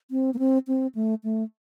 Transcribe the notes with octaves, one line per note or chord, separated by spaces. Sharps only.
C4
A#3
C4
C4
A3
A3